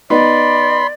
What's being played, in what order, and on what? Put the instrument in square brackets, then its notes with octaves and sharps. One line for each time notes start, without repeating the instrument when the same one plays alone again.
[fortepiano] B3 D#4 [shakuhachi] D5 [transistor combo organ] B5 C6